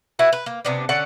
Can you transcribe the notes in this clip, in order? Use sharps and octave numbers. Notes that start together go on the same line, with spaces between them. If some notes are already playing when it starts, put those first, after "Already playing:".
E4 F#4 B4
B4
A#3
C3 B3 D4
D3 C#4 D5 F#5